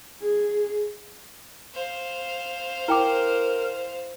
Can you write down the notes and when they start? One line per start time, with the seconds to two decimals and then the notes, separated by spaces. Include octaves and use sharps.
0.22 G#4
1.74 C5 F5
2.88 E4 A#4 G5 D6